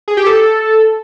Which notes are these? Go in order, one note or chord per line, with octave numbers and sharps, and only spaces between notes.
G#4
G4
A4